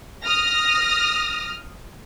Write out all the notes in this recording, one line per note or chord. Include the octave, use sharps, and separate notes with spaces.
D#6 F6 A#6